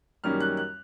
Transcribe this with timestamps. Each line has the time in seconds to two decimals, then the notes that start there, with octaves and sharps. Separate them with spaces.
0.24 F#2 D#3 G3 A#3 C#4 F6
0.40 F#6
0.57 F#6